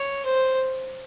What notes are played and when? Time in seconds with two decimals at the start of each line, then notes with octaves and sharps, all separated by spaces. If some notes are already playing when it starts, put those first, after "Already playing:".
Already playing: C#5
0.25 C5